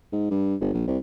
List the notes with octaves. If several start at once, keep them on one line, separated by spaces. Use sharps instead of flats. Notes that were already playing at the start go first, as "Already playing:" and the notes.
G#2
G2
G1
A#1
C2